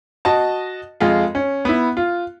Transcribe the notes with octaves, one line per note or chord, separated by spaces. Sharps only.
F#4 D#5 A5
F2 G#3 F4
C#4
B3 E4
F4